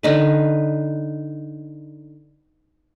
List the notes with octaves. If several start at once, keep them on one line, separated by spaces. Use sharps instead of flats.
D3 D#4 B4